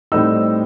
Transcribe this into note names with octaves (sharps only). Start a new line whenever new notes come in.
A2 G3 C4 D#4 E6